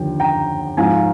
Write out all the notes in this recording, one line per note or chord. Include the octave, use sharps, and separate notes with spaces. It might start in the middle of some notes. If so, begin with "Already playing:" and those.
Already playing: D#2 D3 F3 G5
G5 A#5
G#2 F3 F5 G#5